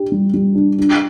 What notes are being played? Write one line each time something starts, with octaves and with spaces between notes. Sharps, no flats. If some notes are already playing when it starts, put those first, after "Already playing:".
Already playing: D4 G4
G3
G3
D4
D4